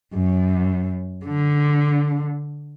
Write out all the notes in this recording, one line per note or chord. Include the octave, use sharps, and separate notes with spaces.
F#2
D3